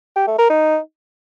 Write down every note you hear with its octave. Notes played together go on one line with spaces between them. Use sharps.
G4
A3
A#4
D#4